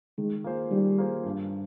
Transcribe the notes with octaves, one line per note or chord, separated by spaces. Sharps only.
D#3 G#3
A#3 F4 G#4 C5
D#3 G3
A#3 F4 G#4 C5
G2